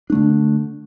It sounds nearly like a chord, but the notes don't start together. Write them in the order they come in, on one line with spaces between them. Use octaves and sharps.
D4 A3 D3